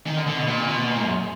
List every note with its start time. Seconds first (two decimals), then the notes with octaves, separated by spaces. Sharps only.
0.06 D#3
0.17 D3
0.27 D3
0.37 B2
0.47 A#2
0.68 B2
0.88 A#2
0.96 G#2
1.03 F#2